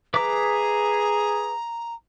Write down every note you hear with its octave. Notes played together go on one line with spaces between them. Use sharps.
G#4 B4 E5 A#5 D6